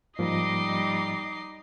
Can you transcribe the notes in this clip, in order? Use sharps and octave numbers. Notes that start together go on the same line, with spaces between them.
G#2 F3 G3 A#3 D#4 D#5 D6 C7